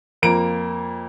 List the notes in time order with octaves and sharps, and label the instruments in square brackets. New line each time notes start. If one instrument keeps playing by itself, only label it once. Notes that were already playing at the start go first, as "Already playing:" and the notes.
[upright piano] F2 A#3 A#5 D7